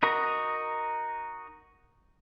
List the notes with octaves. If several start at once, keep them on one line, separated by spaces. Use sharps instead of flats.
D#4 F#4 A#4 A#5